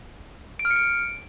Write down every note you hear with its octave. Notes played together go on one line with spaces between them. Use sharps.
D7
F6
C#7
D7